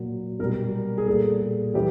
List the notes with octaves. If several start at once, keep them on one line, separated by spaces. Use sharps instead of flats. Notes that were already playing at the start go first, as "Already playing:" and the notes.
Already playing: A#2 F#3
B2 G3 A#4
G#4
A#2 G3 A4
E3 G3 G4